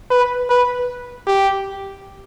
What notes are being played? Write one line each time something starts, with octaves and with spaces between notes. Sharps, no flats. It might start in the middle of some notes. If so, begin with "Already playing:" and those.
B4
B4
G4